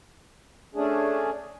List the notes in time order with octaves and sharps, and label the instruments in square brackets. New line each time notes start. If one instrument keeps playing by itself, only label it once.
[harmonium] A3 C#4 D4 G#4